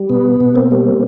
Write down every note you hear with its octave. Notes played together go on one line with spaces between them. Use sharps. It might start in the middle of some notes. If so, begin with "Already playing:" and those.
Already playing: G3
B2 B3
B2
A#3 C4
G3